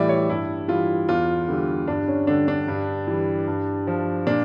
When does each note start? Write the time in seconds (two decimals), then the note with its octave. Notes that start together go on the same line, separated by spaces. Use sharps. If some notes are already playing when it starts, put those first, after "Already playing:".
Already playing: A2 E3 G3 D5 E5
0.09 C#5
0.30 G2 E4
0.68 E3 G3 F4
1.08 E2 F4
1.48 D3 G3
1.88 G2 D4
2.08 C#4
2.27 D3 G3 D4
2.48 D4
2.68 G2
3.07 E3 G3
3.48 G2
3.87 F3
4.27 A#2 D4